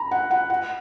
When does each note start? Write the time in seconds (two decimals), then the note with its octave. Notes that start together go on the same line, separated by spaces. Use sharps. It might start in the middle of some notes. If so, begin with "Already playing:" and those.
Already playing: A#5 B5
0.11 F#5
0.31 F#5
0.50 F#5